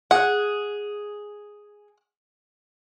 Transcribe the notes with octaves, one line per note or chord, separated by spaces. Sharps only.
G#4 F#5